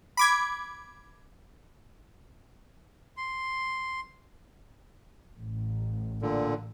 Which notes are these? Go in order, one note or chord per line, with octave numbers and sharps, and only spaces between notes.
B5 D6 G#6
C6
A1
A#2 D3